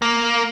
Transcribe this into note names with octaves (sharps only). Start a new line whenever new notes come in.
A#3